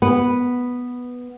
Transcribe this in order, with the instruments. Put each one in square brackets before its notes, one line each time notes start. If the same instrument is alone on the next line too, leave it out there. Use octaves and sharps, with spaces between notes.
[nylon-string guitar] B3